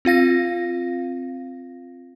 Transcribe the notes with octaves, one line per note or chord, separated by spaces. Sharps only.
C4 F4 F5 A#6